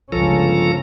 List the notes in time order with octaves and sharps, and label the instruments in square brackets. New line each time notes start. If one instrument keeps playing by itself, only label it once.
[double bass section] G1 C#2 C#4 [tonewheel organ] F3 A4 A#5